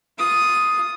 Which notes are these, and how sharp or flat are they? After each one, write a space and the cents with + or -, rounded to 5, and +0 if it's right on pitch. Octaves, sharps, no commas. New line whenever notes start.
F4 +0 D#6 +0